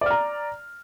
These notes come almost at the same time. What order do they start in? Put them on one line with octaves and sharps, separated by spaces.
D5 F6 A#5